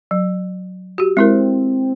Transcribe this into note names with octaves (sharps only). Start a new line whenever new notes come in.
F#3
F#4 G4
G#3 C4 E4 A#4